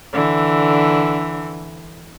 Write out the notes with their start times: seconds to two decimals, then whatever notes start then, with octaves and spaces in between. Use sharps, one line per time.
0.13 D3 E3